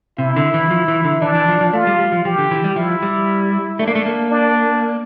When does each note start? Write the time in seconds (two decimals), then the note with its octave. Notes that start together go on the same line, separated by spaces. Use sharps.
0.18 C3 E4
0.36 D3
0.54 E3
0.71 F3
0.88 E3
1.05 D3
1.22 E3 D4
1.35 E3
1.48 F3
1.61 F3
1.73 A3 F4
1.87 G3
1.99 G3
2.12 F3
2.25 F3 G4
2.38 D3
2.51 E3
2.64 G3
2.76 F3 E4
3.03 G3
3.79 A3 D4
3.87 A#3
3.95 A3
4.06 A#3
4.31 D4